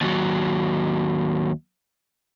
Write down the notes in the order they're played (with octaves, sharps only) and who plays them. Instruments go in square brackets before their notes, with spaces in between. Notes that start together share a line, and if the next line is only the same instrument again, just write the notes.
[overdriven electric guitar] D#2 F#3